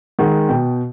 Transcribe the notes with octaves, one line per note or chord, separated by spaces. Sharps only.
D#3 G#3 F#5
B2 G5